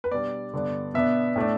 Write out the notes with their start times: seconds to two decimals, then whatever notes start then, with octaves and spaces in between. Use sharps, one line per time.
0.04 B4
0.12 B2 G3 D4 D5
0.53 G2 D3 B3 D4
0.94 B2 B3 D4 E5
1.36 A2 A3 D4